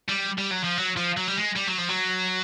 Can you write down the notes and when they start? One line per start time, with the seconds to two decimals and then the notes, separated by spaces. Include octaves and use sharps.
0.09 G3
0.38 G3
0.51 F#3
0.64 F3
0.78 F#3
0.97 F3
1.17 F#3
1.28 G3
1.37 G#3
1.56 G3
1.67 F#3
1.78 F3
1.89 F#3